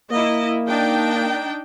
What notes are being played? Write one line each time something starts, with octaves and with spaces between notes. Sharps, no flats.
A#3 E4 D#5
D4 D#4 G5